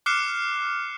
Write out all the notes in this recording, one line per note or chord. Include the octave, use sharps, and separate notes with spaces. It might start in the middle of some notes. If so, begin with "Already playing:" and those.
D6 F6 F#6 C7 C#7 E7